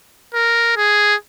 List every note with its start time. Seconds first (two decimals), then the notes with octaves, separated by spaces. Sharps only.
0.34 A#4
0.77 G#4